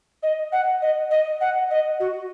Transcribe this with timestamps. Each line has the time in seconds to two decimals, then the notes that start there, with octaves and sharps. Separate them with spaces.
0.23 D#5
0.52 F#5
0.82 D#5
1.11 D#5
1.41 F#5
1.71 D#5
2.00 F#4